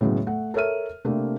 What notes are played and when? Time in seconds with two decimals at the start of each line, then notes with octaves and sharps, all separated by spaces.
0.01 A2 C#3 F#3 G#3 B3
0.27 A3 F#5
0.54 A4 A#4 C#5 E5 F6 D#7
1.05 C3 A3 A#3 C4 D4